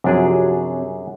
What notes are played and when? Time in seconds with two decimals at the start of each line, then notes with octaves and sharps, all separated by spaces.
0.04 F#2 C3 F3 F#3 D4 G#4